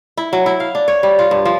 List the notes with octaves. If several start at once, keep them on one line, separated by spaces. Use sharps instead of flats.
E4
F#3
E4
F5
D4
C#5
G3
F4
G2
F3